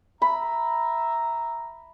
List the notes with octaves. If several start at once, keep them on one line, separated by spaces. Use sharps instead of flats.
E5 A#5 B5